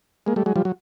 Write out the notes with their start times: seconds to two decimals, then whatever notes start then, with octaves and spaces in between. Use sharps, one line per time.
0.26 G#3 A#3
0.36 G3 A3
0.46 F#3 G#3
0.56 F3 G3
0.65 F#3